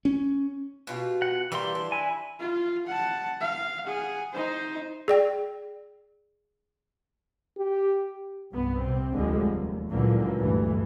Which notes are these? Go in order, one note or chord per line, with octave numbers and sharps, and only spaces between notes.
C#4
B2 F4 G4
F#5
E3 G3 A#3 C6
D4
E4 G#5
F4
F#5 A5
F5
G#4 F#5
D#4 C5
G#4 D5 G5
G4
C2 G2 B3
C3 C4
F1 D2 D3 F3 G3 G#3
D#2
C#2 A#2 D3 E3 F#3 A#3
G1 D2 G2 E3